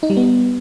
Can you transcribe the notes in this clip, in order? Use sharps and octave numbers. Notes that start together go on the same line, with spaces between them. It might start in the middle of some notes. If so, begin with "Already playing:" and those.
D#4
G3
B3